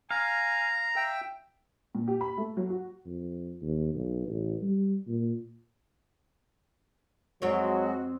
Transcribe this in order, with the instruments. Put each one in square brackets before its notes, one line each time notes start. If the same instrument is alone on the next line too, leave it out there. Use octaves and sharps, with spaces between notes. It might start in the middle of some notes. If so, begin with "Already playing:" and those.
[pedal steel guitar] F5 [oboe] G#5 [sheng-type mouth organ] A#5
[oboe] E5 [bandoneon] G5
[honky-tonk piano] A#2
G4
B5
A3
F#3
F#4
[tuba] F2
D#2
B1
A1
G3
A#2
[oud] F2 C4 C#5 [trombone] F#3 [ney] G#3 [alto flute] F#4